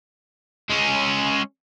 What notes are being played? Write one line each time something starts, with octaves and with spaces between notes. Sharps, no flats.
G#3 C#4